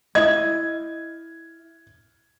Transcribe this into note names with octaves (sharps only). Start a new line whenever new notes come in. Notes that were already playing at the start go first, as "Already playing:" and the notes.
E4 D#5 G#6